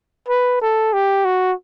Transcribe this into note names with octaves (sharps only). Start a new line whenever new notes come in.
B4
A4
G4
F#4